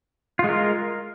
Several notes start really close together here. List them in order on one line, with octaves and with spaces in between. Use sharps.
F4 G#3 A#4